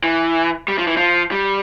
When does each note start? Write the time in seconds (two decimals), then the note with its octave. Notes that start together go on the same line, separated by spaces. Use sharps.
0.04 E3
0.68 G3
0.78 F3
0.87 E3
0.97 F3
1.31 G3